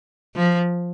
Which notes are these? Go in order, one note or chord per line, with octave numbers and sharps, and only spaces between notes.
F3